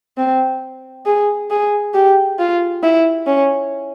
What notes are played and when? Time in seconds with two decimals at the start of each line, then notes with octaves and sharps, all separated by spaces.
0.18 C4
1.06 G#4
1.50 G#4
1.94 G4
2.39 F4
2.83 E4
3.27 C#4